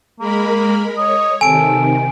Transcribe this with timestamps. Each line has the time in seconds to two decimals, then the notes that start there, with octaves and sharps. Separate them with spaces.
0.19 G#3 A#3 A#4 B5
0.97 C#5 D#5
1.41 C3 D#3 A4 G#5 D7